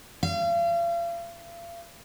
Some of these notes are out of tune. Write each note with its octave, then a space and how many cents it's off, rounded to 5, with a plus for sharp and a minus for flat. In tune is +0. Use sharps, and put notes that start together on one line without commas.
F5 -40